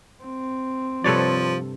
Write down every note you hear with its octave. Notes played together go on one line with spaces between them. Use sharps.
C4
G2 C3 F3 A4 B4 C#5 D5